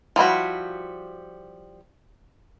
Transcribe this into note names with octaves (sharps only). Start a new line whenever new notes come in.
F3 G3 E4 F#4